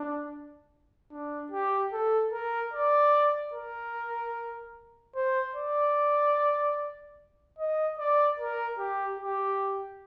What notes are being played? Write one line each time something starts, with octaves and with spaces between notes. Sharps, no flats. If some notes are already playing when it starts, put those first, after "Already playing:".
Already playing: D4
D4
G4
A4
A#4
D5
A#4
C5
D5
D#5
D5
A#4
G4
G4